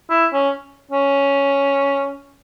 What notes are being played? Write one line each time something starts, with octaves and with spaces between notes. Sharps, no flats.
E4
C#4
C#4